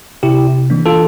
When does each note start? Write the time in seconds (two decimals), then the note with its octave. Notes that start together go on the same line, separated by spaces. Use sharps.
0.23 C3 E4 G4
0.70 E3 A#3 D4
0.86 F4 A4